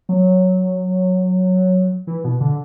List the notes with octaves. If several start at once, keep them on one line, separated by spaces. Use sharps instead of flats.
F#3
E3
B2
D3